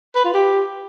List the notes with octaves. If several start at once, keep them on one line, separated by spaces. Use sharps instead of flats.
B4
F4
G4